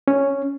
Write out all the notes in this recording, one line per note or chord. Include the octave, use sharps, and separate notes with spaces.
C#4